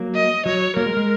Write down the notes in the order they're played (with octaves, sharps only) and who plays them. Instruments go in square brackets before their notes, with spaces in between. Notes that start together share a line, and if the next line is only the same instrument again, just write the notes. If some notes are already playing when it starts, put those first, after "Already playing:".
Already playing: [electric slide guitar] F#3 A#3
[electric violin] D#5
[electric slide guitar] F#3 [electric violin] C#5
[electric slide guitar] F#3 A#3 [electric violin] A#4
[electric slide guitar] G#3
G#3